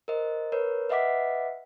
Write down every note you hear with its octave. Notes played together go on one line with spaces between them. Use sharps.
A#4 C5 D#5
A#4 B4 C#5
B4 D#5 E5 F#5 D6 B6